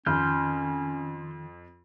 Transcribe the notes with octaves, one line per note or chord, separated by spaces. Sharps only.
F2 D#3 C#4 C6 F6 G6